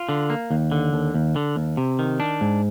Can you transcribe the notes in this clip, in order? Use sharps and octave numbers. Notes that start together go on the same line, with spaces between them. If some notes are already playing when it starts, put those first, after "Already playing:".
Already playing: F4
D3
A#3
D#2
D3
D#2
D#2
D3
D#2
C3
D#3
D4
G#2